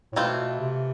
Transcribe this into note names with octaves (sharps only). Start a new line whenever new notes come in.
A2
B2 E3 A3 C4 F4
C3